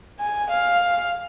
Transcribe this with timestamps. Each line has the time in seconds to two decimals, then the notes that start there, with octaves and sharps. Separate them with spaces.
0.20 G#5
0.51 F5